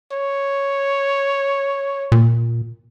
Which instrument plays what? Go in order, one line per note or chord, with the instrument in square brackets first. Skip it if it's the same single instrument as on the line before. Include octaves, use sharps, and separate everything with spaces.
[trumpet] C#5
[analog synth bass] A#2